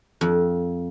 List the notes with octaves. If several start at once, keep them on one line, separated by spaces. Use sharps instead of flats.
F2